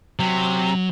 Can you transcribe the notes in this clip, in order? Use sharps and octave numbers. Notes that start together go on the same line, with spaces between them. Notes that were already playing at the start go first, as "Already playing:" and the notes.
C3 F#3